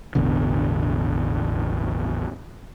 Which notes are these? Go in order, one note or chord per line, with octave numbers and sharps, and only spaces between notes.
E1 A1 B2 D3